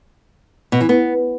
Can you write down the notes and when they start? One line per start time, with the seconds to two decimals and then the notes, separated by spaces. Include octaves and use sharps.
0.72 B2
0.81 E3
0.89 B3